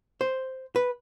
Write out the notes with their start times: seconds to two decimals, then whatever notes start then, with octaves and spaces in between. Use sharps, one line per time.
0.21 C5
0.76 B4